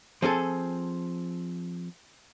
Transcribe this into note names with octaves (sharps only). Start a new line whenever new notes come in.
F3 C4 G#4 A4